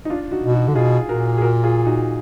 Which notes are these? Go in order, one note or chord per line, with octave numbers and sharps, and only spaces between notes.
D#4
D4 F4
D#4 F#4
B2
D#4 F#4
D3
B2 F4 G#4
A#2 F#4 A#4
G#4
F#4 A#4
F4 G#4
D#4 F#4